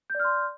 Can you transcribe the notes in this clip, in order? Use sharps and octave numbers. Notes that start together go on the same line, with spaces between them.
D5 C6 F6 G6